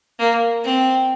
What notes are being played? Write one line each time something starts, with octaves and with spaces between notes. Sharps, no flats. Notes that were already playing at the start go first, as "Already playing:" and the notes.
A#3
C4